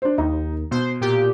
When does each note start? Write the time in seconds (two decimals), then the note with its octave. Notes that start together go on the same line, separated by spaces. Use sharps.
0.02 D4 C5
0.18 D#2 D#4
0.71 B2 C5
1.01 A#2 G4